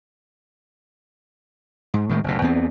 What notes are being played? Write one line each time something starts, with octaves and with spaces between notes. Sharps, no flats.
G#2
A2 D#3 G#3
F#1 D2 B2
E2 B3 C4